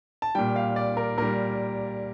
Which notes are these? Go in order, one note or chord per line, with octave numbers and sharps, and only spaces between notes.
A5
A#2 G3 G5
F5
D5
A#4
A#2 G3 A#4